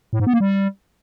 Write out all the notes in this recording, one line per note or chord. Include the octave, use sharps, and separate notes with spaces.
A2
G#2
B3
A#3
G3